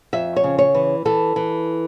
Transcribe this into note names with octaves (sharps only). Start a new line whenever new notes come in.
F2 E5
C#5
C#3
C#5
E3
E3 A4
E3